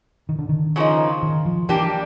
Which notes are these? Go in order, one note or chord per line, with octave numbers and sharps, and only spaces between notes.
D#3
D3
D#3
C#3 F3 A#3 D#4
D#3
F3
E3 G3 A#3 D4 G4